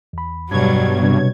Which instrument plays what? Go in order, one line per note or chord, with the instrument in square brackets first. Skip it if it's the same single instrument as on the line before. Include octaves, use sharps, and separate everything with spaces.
[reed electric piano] E2 B5
[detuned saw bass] G2 [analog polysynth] B2 C#5 G#6 [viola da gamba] F#3 G3
[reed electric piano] C3 G3 D4